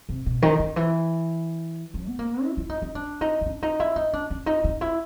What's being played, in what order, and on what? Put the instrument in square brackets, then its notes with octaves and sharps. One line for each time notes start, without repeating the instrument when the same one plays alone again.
[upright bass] C3
B2
D#3
D#3
E3
F3
B3
A#3
E4
E4
D#4
D#4
D4
D#4
D#4
D4
D#4
E4
D#4
D4
D4
D#4
D#4
E4